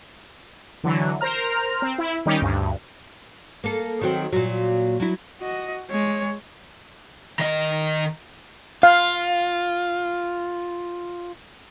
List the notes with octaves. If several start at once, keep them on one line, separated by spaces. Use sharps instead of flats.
D3 E3 F#3
A#4 C5 A#5 F6
C4
E4
D#3 G3 C#4 D#4 G4
D2 G2
A#3 A4
D#3 F#3 C4
A#2 F#3
F#3 E4
F#4 D#5
G#3 C#5
D#3 D#5
F4 F5